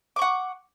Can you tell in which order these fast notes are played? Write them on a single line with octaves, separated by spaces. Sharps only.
D6 C#6 F#5